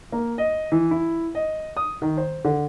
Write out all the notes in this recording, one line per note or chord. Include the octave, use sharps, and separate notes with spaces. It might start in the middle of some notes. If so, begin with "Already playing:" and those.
A#3
D#5
E3
E4
D#5
D#6
D#3
C5
D3